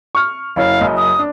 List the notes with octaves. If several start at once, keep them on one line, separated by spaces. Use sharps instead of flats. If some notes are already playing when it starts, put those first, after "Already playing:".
C#6 F6
F#1 E4 C#5 F5
F#1 F#2 D#5
D#6
D4